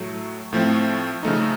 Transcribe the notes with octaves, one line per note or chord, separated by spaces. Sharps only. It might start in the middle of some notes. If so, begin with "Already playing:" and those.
Already playing: A2 F#3 A3
A2 F3 A3 C4
C#3 F3 A3 D#4